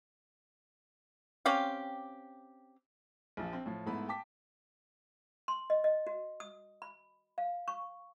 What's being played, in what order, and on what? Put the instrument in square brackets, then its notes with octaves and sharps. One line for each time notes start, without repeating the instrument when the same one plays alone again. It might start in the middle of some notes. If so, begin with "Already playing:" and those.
[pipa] C4 C#4 G4 F5
[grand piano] A#1 F3
C4
A2 F3
G#2 A3 B3 E4 B5
G5 A5 D6 B6
[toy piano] C6
D#5
D#5
F#4
D#6
B5
F5
C#6